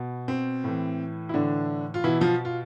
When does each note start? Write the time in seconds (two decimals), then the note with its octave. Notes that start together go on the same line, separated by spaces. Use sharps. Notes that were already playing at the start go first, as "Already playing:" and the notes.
Already playing: B2
0.28 C4
0.64 A2 E3
1.29 E4
1.34 A2 D3 E3 D4
1.94 F4
2.04 B2 E3 E4
2.21 F3 F4
2.45 F4